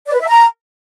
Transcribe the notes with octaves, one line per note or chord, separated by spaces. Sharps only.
D5
B4
E5
A#5